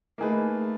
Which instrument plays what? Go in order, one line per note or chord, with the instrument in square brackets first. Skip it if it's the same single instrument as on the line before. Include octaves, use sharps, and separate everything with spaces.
[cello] A3 [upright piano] A#3 D#4 G#4 B4